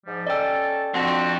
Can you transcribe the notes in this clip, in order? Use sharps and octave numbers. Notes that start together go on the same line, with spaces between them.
G#2 F3 G3
C#4 A4 D5 D#5 G5 A#5 E6
F2 C4 D4 F#4 F#5 A5